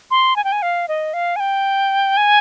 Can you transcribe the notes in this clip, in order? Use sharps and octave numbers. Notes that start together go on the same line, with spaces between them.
C6
G#5
G5
G#5
F5
D#5
F5
G#5
G5
G#5